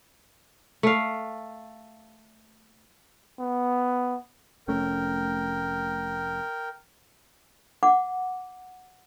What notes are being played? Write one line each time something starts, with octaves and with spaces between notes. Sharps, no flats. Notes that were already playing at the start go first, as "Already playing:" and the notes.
A3 F5
B3
F1 A3 C#4 A#4 G5
F#5 D6